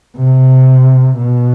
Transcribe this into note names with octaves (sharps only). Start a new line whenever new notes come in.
C3
B2